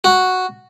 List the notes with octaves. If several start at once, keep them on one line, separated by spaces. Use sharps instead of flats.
F#4